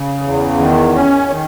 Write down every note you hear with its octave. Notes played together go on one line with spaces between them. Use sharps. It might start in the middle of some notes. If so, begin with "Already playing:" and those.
Already playing: C#3
E2
D#3
C#4
D#3